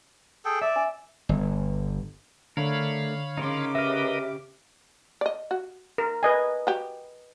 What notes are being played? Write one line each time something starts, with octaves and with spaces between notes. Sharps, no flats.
G#4 A4 G5
D5 E5
G#5
G1
D3 A3 D4 A#4 C#5 F5 B5
C#3 D#4 A#4 C6 D6
G4 A#4 B4 D#5 E5 F6
D5 D#5
F#4
A#4
B4 D#5 G#5
F#4 G4